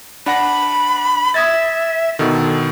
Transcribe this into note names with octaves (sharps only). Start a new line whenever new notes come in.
D4 F#5 B5 A#6
E5 D#6 G#6 A6
B2 D3 D#3 A4